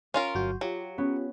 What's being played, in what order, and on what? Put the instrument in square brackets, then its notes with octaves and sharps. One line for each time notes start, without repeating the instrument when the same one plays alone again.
[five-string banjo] C#4 F4 A#4 [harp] C6
[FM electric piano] G1 F#3 F#4 [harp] G6
[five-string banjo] F#3 [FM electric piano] F4 G4
[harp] B3 C#4